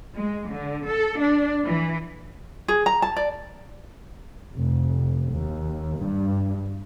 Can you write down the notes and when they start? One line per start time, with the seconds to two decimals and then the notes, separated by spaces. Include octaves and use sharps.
0.15 G#3
0.50 D3
0.88 A4
1.20 D4
1.66 E3
2.68 G#4
2.86 A#5
3.02 A5
3.16 D5
4.56 F1
5.33 D#2
5.98 G2